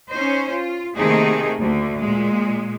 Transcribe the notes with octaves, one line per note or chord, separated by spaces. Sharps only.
C#4 D#4 C5
F4
C3 D#3 A3 A#3 D#4 G#4
D2 D3
A#2 G#3